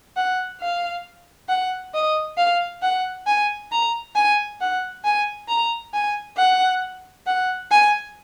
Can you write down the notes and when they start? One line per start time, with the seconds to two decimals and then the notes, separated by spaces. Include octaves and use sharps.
0.16 F#5
0.61 F5
1.48 F#5
1.94 D#5
2.37 F5
2.82 F#5
3.26 G#5
3.72 A#5
4.15 G#5
4.61 F#5
5.04 G#5
5.48 A#5
5.94 G#5
6.37 F#5
7.26 F#5
7.71 G#5